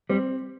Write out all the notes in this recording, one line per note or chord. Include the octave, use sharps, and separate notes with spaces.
G3 C4